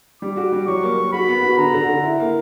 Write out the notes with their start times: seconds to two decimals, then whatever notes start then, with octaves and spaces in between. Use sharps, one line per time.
0.22 G3 D6
0.37 F#4
0.52 G3
0.68 F#3 C#6
0.83 A#3
0.98 A#3
1.13 F#4 B5
1.29 B3
1.43 F#4
1.58 D3 A#5
1.74 D3
1.89 D3
2.04 E4
2.20 A#3